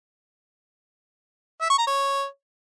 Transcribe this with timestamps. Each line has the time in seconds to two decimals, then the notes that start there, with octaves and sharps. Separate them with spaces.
1.61 E5
1.70 C#6
1.78 A#5
1.87 C#5